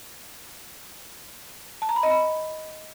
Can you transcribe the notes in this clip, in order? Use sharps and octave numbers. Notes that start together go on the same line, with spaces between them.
A5
A#5
B5
D#5
B5